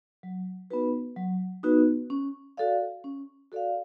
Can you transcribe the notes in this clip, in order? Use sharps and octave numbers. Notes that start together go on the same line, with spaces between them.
F#3
B3 D#4 F#4 B4
F#3
B3 D#4 F#4 B4
C#4
F#4 A4 D5 F5
C#4
F#4 A4 D5 F5